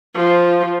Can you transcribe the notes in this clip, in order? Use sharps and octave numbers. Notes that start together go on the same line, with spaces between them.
F3